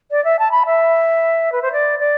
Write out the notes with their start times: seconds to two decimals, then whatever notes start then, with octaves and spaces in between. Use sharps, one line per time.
0.11 D5
0.25 E5
0.39 A5
0.51 B5
0.66 E5
1.52 B4
1.62 C5
1.73 D5
1.99 D5